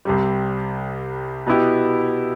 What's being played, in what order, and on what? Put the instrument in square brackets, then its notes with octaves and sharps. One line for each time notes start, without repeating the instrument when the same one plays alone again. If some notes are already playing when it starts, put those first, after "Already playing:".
[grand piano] C2 C3 G3
B2 B3 E4 G4